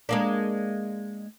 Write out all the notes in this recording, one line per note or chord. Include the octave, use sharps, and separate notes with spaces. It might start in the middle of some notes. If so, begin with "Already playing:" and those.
G#3 A#3 D4